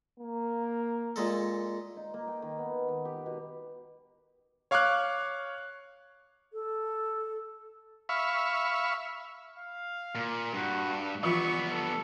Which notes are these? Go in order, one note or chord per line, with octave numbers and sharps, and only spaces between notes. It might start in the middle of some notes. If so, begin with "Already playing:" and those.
A#3
A#2 G#3 A4
D#4
A#3
G5
D#3
B3
D#3
G4
B2
C#5 F5 C#6 D6 F6 F#6
A4
E5 F5 B5 C#6
F5
A#2
G2 F#4
E3 F3 G3 B3 F4 C#6
A4